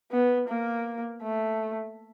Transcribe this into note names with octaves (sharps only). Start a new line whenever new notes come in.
B3
A#3
A3